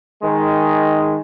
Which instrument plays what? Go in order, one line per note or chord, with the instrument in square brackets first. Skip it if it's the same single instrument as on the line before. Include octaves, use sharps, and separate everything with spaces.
[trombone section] D#3 G#3